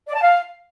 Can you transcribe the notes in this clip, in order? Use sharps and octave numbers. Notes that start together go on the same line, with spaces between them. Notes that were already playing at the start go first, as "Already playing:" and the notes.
D5
A5
F5